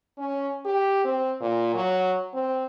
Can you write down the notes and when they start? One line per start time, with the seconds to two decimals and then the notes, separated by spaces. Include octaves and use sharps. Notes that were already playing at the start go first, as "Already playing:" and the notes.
0.18 C#4
0.65 G4
1.04 C4
1.41 A#2
1.74 F#3
2.34 C4